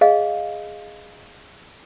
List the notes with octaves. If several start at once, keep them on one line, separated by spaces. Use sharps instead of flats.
G#4 D#5 F5